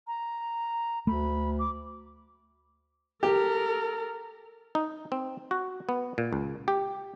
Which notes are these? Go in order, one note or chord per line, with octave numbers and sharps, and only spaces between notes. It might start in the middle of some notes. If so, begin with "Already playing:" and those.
A#5
D2 A3 B5
D6
G4 A4 A#4
D#4
C4
F#4
B3
A#2
C#2
G4